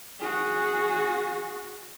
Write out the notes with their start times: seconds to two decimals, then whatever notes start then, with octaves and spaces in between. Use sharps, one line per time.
0.19 F#4 G#4